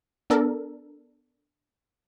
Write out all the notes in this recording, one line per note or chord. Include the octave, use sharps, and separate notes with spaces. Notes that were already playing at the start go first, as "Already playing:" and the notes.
B3 D4 A4 A#4